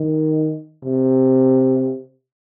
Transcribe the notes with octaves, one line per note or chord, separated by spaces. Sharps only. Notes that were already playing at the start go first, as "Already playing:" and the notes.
Already playing: D#3
C3